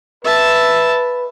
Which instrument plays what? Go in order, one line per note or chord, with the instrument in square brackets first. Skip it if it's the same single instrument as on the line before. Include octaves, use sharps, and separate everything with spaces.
[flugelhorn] B4 [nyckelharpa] E5 A5